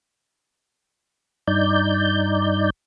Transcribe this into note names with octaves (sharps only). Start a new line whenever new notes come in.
G2 D#4 D5 G6